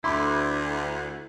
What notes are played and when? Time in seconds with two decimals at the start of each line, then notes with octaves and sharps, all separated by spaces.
0.04 D2 E4 B5 C6 D6